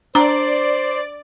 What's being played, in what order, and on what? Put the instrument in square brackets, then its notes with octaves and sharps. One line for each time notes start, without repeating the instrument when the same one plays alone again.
[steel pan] D4 [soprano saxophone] C5 [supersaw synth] D5 [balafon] A#5